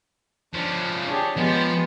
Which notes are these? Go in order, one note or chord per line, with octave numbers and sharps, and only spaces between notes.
F3 C#4 D4
D4 G4 G#4 C#5
F3 G#3 B3 G4